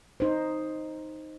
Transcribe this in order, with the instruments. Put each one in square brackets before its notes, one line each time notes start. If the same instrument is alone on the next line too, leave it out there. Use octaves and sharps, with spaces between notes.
[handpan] D#4 C5